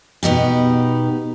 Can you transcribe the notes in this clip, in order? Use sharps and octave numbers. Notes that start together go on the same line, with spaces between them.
B2 B3 D#4 G4